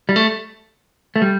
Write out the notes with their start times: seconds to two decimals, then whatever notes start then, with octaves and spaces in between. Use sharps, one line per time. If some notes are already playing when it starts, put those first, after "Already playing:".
0.09 G3
0.16 A3
1.16 A3
1.22 G3